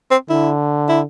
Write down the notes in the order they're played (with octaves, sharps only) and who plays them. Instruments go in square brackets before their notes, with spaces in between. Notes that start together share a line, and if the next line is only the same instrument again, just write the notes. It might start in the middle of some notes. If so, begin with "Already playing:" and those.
[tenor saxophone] C4
[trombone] D3 [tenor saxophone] E4
[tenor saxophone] E4